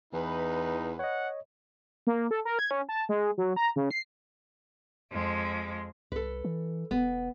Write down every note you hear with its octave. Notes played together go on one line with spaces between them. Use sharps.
E2 E3 D#4 B4
C#5 D#5 F#5
A#3
A4
A#4
G#6
C#4
A5
G#3
F#3
A#5
C#3
C7
F2 G#3
C2 A4 B4
E3
E1 B3